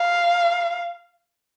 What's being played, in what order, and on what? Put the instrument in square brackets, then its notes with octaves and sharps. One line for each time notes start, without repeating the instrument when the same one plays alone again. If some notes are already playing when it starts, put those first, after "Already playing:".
Already playing: [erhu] F5